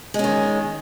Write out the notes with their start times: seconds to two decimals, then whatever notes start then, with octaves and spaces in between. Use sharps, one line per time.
0.14 G#3
0.19 C#4
0.24 D#3